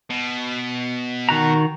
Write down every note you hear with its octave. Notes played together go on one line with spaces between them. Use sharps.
B2
D#3 F#4 A#5